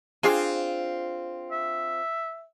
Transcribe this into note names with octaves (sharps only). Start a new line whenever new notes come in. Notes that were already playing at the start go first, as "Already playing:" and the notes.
C4 D4 F4 G#4 G#5
E5